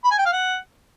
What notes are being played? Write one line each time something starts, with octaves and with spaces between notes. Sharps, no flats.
B5
G#5
G5
F5
F#5